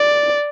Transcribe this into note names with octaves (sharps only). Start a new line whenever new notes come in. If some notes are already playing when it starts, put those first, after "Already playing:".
Already playing: D5